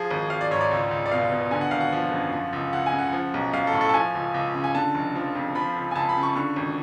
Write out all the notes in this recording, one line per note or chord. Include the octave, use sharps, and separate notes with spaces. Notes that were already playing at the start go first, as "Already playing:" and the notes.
Already playing: F3 G#4
G#1
G#1 F5
D5
G#2 C#5
D5
C#2
C#2
D5
B2 F5
B2
D3 G#5
F#5
G#1 F5
F#5
F3
F#2
F3
C#2
C#2 F#5
G#5
C#3
F#5
F3
B1
B1 F5
A4
A2
A4
A5
F3 G#5
C#2
C#2
C#3
G#5
D3 A5
F1
F3
F2
F3 B5
C#2
G#5
C#2 A5
B5
C#3
C#6
D3 C#6
G#1